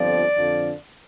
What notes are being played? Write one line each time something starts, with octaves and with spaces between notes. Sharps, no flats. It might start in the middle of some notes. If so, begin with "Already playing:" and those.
Already playing: G1 F2 D3 F3 D5
F2 D3 F3